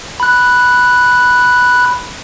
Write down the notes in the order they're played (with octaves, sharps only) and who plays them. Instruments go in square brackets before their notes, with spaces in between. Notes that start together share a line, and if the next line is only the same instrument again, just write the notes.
[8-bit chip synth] B5 F#6